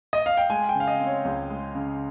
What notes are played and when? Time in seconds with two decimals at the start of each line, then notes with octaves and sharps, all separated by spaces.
0.13 D#5
0.26 F5
0.37 G5
0.50 G#3 G#5
0.69 G5
0.75 C#3
0.80 F5
0.88 D#5
1.00 C4
1.07 C#5
1.25 C#2
1.50 G#3
1.75 C#3